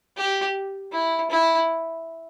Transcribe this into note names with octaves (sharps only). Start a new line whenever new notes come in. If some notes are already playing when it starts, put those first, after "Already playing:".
G4
E4
E4